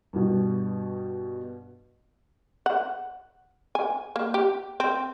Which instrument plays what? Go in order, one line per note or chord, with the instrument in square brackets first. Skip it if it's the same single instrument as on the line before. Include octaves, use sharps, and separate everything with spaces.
[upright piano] G2 B2
[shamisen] F#5
G#5
A#3
G4
C4